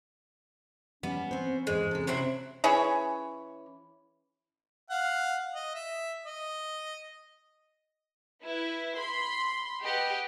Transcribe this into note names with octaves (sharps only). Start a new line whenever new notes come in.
G3 B3 C#4
C4 C5
E2 G#2 G#3
C3 A4
C3 F#3 C4 E4
E3 C#4 G#4 C#5
F5 F#5
D#5
E5
D#5
E4 B4
B5 C6
G4 B4 D#5 F#5